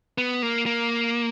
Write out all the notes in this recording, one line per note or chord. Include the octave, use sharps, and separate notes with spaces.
B3
A#3
A#3